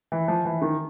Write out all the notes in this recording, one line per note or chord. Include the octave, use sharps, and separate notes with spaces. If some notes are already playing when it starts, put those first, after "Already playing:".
E3
F3
E3
D#3